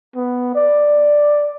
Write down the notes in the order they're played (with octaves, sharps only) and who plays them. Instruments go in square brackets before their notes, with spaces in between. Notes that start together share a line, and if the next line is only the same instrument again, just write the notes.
[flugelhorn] B3
D5